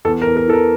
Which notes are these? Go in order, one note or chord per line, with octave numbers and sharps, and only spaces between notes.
E2 A4
A#4
E2
A#4
E3 A4
A#4